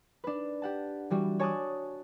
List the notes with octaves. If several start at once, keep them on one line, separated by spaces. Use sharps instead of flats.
D4 B4
G4 F#5 A5
E3 G3 F#4
C#5 G#5 A5 D6 D#6 F#6